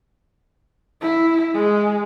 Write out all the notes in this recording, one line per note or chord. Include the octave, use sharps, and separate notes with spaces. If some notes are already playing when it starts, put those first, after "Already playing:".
E4
G#3